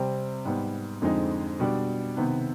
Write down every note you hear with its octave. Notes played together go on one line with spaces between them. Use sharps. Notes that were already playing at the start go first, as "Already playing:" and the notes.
Already playing: C3 G3 C4
G#2 G3 B3
F2 D3 G#3 C4 D#4
B2 G3 D4
C3 D#3 B3